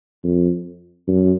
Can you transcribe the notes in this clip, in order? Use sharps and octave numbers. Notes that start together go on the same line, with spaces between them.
F2
F#2